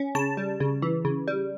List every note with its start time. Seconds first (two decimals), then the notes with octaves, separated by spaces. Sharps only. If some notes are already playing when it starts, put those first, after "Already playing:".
Already playing: C#4
0.15 C#3 A5
0.37 G3
0.60 C#3
0.82 E3
1.05 C#3
1.28 G3